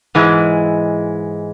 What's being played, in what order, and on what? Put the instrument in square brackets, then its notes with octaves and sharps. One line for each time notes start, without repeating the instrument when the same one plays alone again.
[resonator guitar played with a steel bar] G#2 E3 G#3